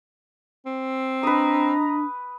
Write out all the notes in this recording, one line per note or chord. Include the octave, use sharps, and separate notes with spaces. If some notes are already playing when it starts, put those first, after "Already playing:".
C4
D4 B4 D#5 A#5 D#6